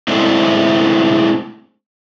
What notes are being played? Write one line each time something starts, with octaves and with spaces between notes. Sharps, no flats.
G#3 A3 C4 D4 E4 C5